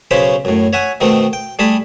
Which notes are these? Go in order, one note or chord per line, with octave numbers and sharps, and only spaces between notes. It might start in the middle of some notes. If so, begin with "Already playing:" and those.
B1 C#3 C#4 C5 B5 C6
F#2 A2
C#5 E5 F#5 G#5
B2 D#3 A3 C4 D#4
G5
G3 A3 G#4 A5 B5